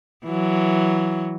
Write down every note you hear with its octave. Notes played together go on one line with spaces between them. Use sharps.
E3 F#3